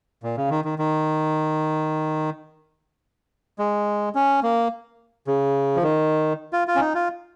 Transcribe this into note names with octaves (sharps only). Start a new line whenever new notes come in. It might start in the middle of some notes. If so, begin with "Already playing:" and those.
A#2
C#3
D#3
D#3
D#3
G#3
C#4
A#3
C#3
F3
D#3
F4
F4
C#4
D#4
F4